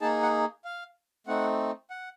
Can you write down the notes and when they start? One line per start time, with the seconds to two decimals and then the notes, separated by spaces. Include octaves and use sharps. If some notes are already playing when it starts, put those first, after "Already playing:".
0.01 A#3 D#4 G#4 A5
0.22 F#5
0.65 F5
1.27 A3 C4 D#4 F#5
1.90 F#5